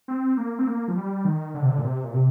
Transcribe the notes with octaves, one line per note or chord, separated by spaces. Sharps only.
C4
A#3
C4
A#3
F3
G3
D#3
D3
C3
D3
A#2
C3
A#2
C3